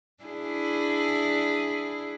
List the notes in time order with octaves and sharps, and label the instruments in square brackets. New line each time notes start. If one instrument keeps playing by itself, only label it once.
[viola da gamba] D4 E4 G#4